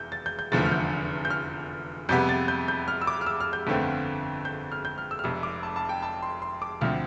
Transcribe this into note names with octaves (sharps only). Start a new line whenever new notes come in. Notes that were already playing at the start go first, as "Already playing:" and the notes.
Already playing: F1 E2 G6
A6
G6
G6
F1 E2 D3 F3 A3 A6
F6
G6
G6
F6
F2 C3 G3 B3 G6
A6
G6
G6
F6
E6
D6
F6
E6
F6
G6
G1 F2 D3 A3 C4
G6
F6
G6
F6
E6
F6
F1 F2 C3 E6
D6
A5
A5
G5
A5
C6
C6
D6
D2 D3 F3 C4 F6